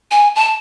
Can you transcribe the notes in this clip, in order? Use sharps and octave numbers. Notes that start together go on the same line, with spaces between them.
G#5
A5